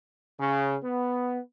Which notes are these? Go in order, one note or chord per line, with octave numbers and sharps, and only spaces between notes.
C#3
B3